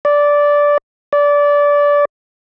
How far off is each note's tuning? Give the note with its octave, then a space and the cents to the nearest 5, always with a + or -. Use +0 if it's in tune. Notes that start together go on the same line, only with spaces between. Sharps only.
D5 -10
D5 -20